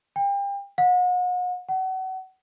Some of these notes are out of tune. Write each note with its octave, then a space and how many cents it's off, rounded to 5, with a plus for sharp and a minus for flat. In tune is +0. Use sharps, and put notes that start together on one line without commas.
G5 +30
F#5 -40
F#5 +30